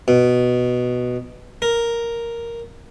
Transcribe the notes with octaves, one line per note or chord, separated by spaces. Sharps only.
B2
A#4